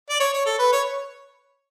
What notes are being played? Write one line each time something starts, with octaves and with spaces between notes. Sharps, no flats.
D5
C#5
C#5
A4
B4
C#5